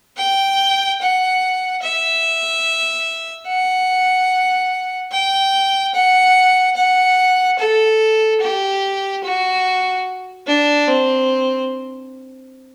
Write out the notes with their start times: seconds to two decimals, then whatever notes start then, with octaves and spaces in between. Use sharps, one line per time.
0.18 G5
1.01 F#5
1.83 E5
3.47 F#5
5.12 G5
5.95 F#5
6.77 F#5
7.59 A4
8.41 G4
9.24 F#4
10.48 D4
10.88 C4